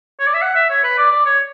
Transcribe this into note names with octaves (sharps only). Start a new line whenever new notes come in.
C#5
D5
E5
F#5
E5
C#5
B4
D5
D5
C#5